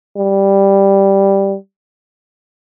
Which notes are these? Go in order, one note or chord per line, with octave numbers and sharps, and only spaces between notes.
G3